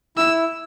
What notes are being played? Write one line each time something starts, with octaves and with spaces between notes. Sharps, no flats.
E4 E6